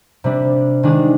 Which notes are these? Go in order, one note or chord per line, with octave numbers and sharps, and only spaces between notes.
C3 G3 D4
D#3 G#3 D4 G#4